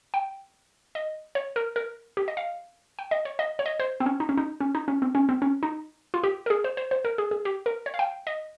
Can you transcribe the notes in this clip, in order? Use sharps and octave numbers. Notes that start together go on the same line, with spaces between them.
G5
D#5
C#5
A#4
A#4
G4
D#5
F5
G5
D#5
C#5
D#5
C#5
D#5
C5
C4
C#4
D#4
C#4
D#4
C#4
D#4
C#4
C4
C#4
C4
C#4
D#4
F4
G4
A#4
G#4
C5
C5
C5
A#4
G#4
G#4
G4
A#4
C#5
F5
G5
D#5